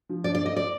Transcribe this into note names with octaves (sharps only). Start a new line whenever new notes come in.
F3
D4 D5
D5
A3
D#5
D5